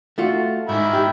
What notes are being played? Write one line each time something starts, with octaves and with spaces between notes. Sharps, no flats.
A3 F4 F#4
G#2 D#3 E5 B5
G4